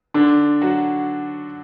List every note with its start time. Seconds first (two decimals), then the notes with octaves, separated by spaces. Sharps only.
0.14 D3 D4
0.61 F#3 F#4